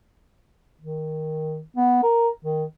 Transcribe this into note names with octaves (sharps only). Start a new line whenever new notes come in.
D#3
B3
A#4
D#3